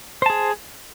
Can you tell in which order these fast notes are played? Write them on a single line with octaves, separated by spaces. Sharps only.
C5 A5 G#4